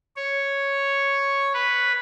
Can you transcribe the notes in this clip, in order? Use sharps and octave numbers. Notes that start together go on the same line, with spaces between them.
C#5
B4